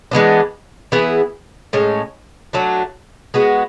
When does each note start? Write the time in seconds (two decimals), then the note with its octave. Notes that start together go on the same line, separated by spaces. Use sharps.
0.11 E3 G#3 B3 D4
0.92 E3 B3 E4 G#4
1.73 A2 G#3 C#4
2.53 F#3 A3 D4
3.34 G#3 B3 F#4